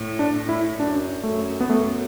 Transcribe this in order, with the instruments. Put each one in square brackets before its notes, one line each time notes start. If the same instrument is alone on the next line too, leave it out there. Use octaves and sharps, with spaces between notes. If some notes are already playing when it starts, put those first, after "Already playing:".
Already playing: [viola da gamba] A2
[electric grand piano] D4
[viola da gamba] A2
[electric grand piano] E4
[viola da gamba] F#2 [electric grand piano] D4
[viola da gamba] F#2 [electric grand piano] A3
[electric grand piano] B3
[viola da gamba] F#2 [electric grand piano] A3